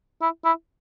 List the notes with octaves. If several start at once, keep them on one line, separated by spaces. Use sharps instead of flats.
E4
E4